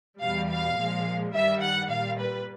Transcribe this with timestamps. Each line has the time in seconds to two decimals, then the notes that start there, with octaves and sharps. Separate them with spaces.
0.21 E2 B2 G3 F5
0.49 F5
0.77 A#2 F3 G#3
1.34 G2 D#3 G3 E5
1.62 F#5
1.90 A#2 G3 F5
2.18 B4